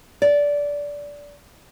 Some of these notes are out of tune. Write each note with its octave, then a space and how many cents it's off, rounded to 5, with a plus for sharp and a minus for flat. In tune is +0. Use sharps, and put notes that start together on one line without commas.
D5 -15